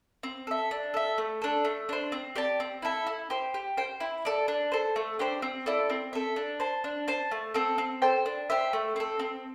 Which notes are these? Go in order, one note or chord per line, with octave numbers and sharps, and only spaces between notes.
C4
A4 E5
D4
A4 E5
A3
D4 A4
A3
D4 C5
C4
G4 D5 A5
C4
E4 A4 E5
E4
G4 C5
G4
C5 G5
E4
A4 D5
D4
A4 C5
A3
D4 G4 C5
C4
E4 A4 D5
C4
A4 E5
D4
C5 A5
D4
C5 A5
A3
C4 A4
C4
A4 C5 G5
D4
G4 C5 E5
A3
C4 A4
C4